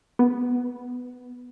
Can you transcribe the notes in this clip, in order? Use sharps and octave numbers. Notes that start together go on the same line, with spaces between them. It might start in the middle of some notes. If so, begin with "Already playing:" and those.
B3